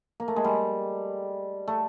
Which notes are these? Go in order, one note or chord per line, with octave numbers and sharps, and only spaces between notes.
A#3
A3
G#3
G3
A3